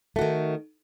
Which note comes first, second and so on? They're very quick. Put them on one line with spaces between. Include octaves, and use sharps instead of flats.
A3 F#4 D#3